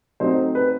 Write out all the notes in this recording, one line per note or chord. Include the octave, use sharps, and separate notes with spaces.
F#3 A3 C4 D#4 C5
B4